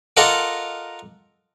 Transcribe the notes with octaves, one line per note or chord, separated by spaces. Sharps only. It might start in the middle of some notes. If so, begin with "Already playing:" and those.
F4 A4 A#4 D#5 F#5 D6